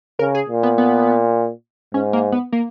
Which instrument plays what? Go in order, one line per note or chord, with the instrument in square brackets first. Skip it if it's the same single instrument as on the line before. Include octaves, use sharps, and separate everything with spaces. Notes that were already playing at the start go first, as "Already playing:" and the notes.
[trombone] C#3 [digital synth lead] A#4
[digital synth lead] G#4
[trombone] A#2
[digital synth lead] B3
B3
[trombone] G#2 [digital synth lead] C#4
[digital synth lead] A#3
B3
A#3